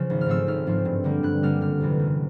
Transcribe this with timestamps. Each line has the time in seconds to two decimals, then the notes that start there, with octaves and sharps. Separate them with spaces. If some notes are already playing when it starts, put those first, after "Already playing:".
Already playing: C#3 F3
0.10 G#1
0.21 F6
0.26 G#2 F3 A3 C4 E6
0.47 G#1 F6
0.66 G#2 F3 A3 C4
0.85 G2
1.04 D3 G3 A#3
1.23 G2 F#6
1.42 D3 G3 A#3 F6
1.61 F#1 F6
1.81 F2 C3 E3
1.99 F#1